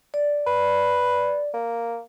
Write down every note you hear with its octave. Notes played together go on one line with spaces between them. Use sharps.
D5
B4
A#3